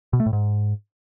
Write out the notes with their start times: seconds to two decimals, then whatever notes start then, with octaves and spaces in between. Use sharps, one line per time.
0.13 B2
0.20 A3
0.26 A2
0.33 G#2